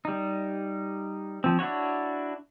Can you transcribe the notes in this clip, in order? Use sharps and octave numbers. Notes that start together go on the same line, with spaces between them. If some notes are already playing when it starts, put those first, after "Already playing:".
G3 D#4
F3 C4
D4 E4 F#4 C#5